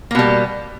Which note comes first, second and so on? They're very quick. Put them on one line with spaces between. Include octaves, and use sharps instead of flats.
A#3 B2 G3